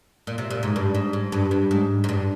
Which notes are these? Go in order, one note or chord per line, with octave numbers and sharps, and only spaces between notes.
A#2
C3
A#2
G#2
G2
G#2
G#2
G2
G2
G#2
G#2
G2